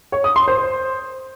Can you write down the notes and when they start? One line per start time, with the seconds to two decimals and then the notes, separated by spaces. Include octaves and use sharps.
0.12 C#5
0.24 D#6
0.36 C6
0.48 C5